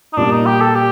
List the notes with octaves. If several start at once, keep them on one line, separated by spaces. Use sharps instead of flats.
D#4
A#2 G3 A#3 D4
D#4
G4
A4
G4